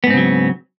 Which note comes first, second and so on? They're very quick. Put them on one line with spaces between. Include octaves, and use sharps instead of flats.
B3 G#2 C4 C#3 F#3